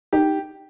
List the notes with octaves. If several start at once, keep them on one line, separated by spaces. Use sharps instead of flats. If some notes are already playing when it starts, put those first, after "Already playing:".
D#4 G4